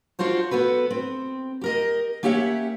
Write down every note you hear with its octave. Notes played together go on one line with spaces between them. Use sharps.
D4 F4 F#4 C5 C#5
B3 F#4 A4 B4
C4
G4 A#4 D#5
A#3 C#4 G4 C#5 E5 F#5